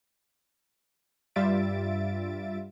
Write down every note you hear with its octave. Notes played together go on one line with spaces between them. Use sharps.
G2 G3 F4 E5 A6 D7